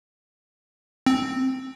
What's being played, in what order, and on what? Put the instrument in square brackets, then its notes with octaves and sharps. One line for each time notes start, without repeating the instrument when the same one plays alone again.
[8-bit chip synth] C4